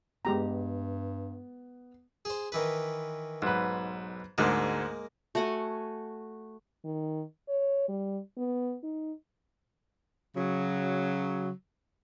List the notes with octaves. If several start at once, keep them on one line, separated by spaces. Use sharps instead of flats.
G2 G#3 B3 G4 A#5
G#4 C5
D#3 E3 B4
B1 G#2 B4
D2 G#2 G#3 A#3
A3 F#4 F#5 G#5
D#3
C#5
G3
B3
D#4
C#3 F#3